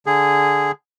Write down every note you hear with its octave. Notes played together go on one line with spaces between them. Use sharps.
D3 G#4